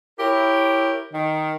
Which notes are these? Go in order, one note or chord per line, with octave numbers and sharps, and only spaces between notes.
E4 G4 A#4 C#5
D#3